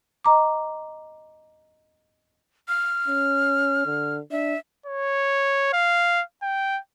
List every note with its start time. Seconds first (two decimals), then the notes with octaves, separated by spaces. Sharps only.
0.25 D#5 A#5 D6
2.68 F6
3.08 C#4
3.86 D3
4.31 D4 E5
4.86 C#5
5.73 F5
6.43 G5